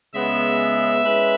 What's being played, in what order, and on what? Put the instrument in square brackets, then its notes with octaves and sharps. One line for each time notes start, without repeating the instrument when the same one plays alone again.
[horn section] C#3 G#3 B3 [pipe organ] E5
[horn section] G#3 C#4 E4 B4